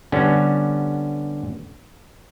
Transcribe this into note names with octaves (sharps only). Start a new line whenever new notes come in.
D3 G3 B3 C#4